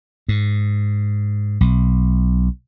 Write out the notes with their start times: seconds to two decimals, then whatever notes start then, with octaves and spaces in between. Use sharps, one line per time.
0.29 G#2
1.61 B1